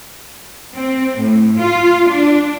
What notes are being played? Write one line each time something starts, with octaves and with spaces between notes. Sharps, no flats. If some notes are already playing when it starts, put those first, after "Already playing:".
C4
A2
F4
D4